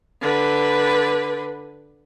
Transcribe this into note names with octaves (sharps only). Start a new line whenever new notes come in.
D3 B4